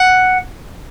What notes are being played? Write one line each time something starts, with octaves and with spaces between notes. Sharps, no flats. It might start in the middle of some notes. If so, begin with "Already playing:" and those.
Already playing: F#5